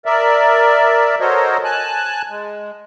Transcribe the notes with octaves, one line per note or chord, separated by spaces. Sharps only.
A#4 D5 E5
F#4 A4 A#4 C5 C#5 D#5
G#5 A5 F#6
G#3